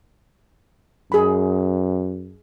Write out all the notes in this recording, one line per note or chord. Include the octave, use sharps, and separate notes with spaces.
F#2 G#4 B5